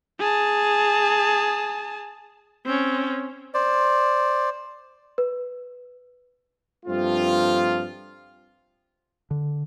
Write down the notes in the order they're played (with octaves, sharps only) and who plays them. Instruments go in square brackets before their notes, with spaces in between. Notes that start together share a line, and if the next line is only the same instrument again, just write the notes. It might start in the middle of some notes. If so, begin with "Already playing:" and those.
[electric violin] G#4 A5
[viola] C4 C#4
[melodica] C5 D5
[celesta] B4
[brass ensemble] G2 F3 A3 C4 F4
[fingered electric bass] D3